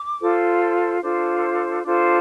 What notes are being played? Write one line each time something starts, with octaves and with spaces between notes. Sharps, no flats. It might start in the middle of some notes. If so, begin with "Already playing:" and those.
Already playing: D6
F4 A4 C5
D4 F4 A4 C5
D4 F4 A4 C5